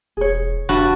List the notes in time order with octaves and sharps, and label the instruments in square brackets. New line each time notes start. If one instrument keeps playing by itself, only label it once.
[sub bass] E1 [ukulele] G#4 C#5
[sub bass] F1 [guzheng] G2 F#4 A5